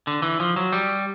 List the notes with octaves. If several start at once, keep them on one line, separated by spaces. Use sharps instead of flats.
D3
E3
F3
F#3
G3